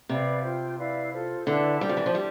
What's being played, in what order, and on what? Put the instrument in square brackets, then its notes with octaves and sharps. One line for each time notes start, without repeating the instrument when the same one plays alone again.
[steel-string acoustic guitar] C3 [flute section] B4 D5 F5 B5
[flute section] F4 C5 G5 C6
E4 B4 D5 F5
F4 A4 C5
[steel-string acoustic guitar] D3 [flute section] E4 B4 D5 A5
[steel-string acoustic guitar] G3 [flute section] D4 G4 D5
[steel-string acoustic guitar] F3
E3
F3
[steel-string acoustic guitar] G3 [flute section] D4 G4